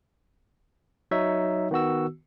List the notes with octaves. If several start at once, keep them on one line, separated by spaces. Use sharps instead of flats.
F#3 D#4 C#5 E5
D#3 B3 F#4 E6